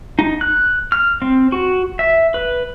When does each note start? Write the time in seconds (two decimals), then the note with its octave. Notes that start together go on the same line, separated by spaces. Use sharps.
0.19 D#4
0.41 F#6
0.92 F6
1.22 C4
1.52 F#4
1.99 E5
2.34 B4